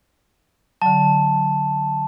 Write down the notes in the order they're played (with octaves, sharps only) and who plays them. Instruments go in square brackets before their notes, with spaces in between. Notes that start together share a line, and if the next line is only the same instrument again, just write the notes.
[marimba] D3 F#3 [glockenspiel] A5